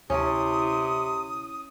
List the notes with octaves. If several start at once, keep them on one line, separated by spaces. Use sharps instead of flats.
D2 C3 C#4 E4 A5 D#6